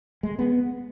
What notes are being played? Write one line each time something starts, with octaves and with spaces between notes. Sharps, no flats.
G#3
B3